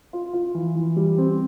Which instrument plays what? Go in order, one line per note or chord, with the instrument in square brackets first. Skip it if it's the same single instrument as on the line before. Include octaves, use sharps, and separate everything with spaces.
[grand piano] F4
F4
E3
E3
G3
C4